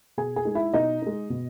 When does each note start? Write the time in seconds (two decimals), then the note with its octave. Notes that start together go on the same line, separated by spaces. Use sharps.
0.17 B2 G#4 G#5
0.36 G#4 G#5
0.45 G#3 D#4
0.55 E4 E5
0.74 B2 D#4 D#5
1.02 G#3 D#4
1.30 B2